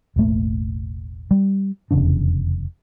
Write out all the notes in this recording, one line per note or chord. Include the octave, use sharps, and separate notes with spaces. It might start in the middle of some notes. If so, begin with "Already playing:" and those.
E1 A1 A3 A#3
G3
F1 E2 C#3 D4